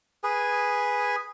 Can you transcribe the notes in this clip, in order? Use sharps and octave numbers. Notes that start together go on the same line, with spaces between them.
G#4 B4 G#5